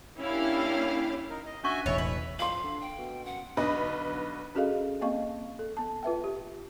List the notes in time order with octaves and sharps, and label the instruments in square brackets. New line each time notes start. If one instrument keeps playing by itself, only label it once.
[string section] A#3 C#4 D4 E4 G4 F5
[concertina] D#4 A#4
D#5
[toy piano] C#4 D4 C#6 [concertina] F#4 E5 G#5
[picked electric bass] E1 A1 [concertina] E4 E5 [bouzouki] C#5 [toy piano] D#5 G#5
[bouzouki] B4
[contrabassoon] F3 [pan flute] F5 [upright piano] C6 F#7
[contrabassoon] D3
[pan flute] G5
[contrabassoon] B2
[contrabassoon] F#2 [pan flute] F#5
[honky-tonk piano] B1 D3 B3 B4 D#5 B5
[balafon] C#4 F#4 G#4 A4 D#5 F5
A#3 C4 D#5 F5 C#6
A4
B3 A5
F4 B4 E5 G5
G4